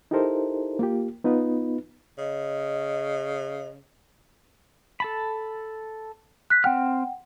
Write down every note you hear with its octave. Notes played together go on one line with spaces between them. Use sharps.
D#4 E4 G4 A4 A#4 C5
A#3 F4 G4
B3 D#4 F4 B4
C#3 D#5
A4 A5 B5
F#6 B6
C4 F#5 G5 F6